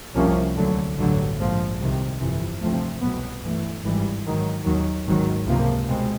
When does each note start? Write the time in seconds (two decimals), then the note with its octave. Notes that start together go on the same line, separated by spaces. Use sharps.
0.15 C2 C3 F3 A#3 C#4
0.56 D2 D3 F#3
0.97 A1 G2 D3 F#3
1.38 A#1 G#2 F3
1.79 C2 C3 D#3
2.19 G1 F2 C3 E3
2.60 D2 C3 F3 A3 C4
3.01 C2 B2 F#3 B3
3.42 G2 E3 A3
3.83 G#1 G2 E3 G3
4.24 G#2 D#3 F#3
4.64 D#2 D#3 F#3
5.06 G#1 G#2 D#3 F#3
5.47 C#2 C3 F3 A#3
5.87 B2 G#3 C4